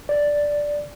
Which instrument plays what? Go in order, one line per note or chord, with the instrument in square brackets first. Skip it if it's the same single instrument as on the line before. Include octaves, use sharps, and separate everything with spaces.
[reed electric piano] D5